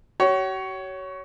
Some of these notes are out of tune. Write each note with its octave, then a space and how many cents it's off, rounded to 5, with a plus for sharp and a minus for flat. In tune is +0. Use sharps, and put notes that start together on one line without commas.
F#4 +45 C#5 +10